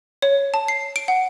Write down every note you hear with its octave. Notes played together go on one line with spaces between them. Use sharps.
C#5
A5
C7
D7
F#5